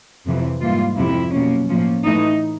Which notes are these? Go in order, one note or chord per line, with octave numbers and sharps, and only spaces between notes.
F2 C3 E3
G#2 E3 G3 A#3 F4
F2 C3 F3 E4
B2 F#3 A#3 C#4
A2 F3 A#3 C#4
A2 E3 A3 D#4